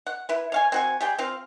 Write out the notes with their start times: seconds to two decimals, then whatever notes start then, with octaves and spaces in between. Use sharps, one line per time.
0.07 F#5
0.29 E4 B4
0.52 C#5 F5 G#5
0.72 C4 F#4 G#5
1.01 G3 G#4 G5
1.18 C4 F4 F5